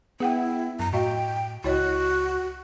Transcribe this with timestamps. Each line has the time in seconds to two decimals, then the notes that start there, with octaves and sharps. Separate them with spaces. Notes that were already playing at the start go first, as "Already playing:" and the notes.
0.20 B3 E4 G#4 F#5 G5
0.79 F#2 A#5
0.93 A2 F#4 D#5 F5 G5
1.64 C#2 E4 F#4 C#5 D#5